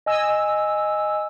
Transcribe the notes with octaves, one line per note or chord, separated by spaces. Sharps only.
D#5 G#5 E6